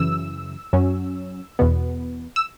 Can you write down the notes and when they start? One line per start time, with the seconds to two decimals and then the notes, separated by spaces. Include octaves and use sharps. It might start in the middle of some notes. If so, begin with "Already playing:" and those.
Already playing: F#2 C#3 E3 E6
0.73 F#2 F#3 C#4
1.59 E2 B2 B3
2.36 E6